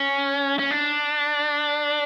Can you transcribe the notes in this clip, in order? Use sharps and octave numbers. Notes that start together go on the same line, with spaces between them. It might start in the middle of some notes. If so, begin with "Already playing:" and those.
Already playing: C#4
C#4
D4